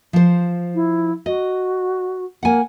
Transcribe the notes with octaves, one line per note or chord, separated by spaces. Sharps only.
F3 C5
E4
F#4 D#5
A#3 F#5 G#5